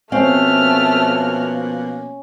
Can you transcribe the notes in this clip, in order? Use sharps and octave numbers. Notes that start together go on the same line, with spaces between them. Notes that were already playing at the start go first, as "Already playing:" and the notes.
B2 F3 A3 A#3 C4 C#4 F5 F6